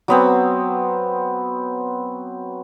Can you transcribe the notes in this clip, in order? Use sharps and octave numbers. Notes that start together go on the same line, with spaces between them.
F#3 B3 C4